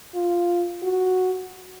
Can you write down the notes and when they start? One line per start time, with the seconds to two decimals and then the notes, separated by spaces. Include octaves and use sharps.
0.15 F4
0.83 F#4